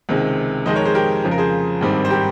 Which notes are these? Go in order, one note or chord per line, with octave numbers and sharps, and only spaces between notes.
C#2 C3 D#3 G#3
F2 D#3 G#3 C5 D#5
A#4 C#5
G#4 C5
G4 A#4
F2 C#3 F3
A#4
G#4 C5
G#1 G2 D#3 G3 C4
C5
G4 A#4